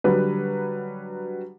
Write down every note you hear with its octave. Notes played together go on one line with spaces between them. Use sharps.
D3 F#3 G3 B4